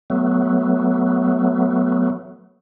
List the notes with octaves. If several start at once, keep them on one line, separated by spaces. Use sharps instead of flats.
F#3 A3 B3